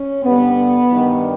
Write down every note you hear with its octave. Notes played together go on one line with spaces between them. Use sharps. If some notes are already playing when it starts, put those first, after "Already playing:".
Already playing: C#4
G2 D3 G3 B3
G2 D#3 G3